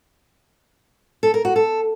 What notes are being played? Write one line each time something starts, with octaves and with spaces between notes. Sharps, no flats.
A4
A#4
F#4
A4